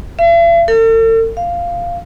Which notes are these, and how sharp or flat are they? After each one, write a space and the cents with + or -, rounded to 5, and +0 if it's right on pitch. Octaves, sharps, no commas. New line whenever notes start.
E5 +45
A4 +45
F5 -5